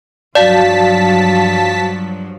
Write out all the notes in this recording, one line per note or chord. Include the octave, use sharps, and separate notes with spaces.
G2 F3 F#3 F#4 D5 F5 A5 B6